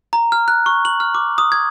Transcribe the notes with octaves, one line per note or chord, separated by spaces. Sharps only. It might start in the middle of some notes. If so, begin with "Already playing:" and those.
A#5
F6
F#6
C#6
F#7
F6
D6
D#6
G#6